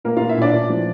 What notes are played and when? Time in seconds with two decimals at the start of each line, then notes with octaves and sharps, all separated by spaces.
0.05 A#2 A#3 A#4
0.17 A#2 F4 F5
0.29 E4 E5
0.38 A#2 D4 D5
0.53 A#2
0.70 F3